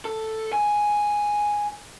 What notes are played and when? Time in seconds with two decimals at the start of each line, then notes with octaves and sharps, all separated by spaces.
0.05 A4
0.53 G#5